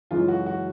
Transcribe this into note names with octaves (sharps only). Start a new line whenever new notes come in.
F#2 C#3 E3 G#3 F4
F#4
F#4